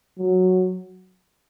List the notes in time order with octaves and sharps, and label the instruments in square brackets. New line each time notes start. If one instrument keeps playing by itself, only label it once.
[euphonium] F#3